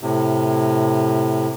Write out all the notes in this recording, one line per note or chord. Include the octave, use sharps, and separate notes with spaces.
A2 C3